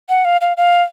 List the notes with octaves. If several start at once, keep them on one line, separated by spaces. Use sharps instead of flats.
F#5
F5
F5
F5